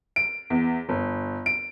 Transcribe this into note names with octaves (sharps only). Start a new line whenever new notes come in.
D7
E2
G1
D7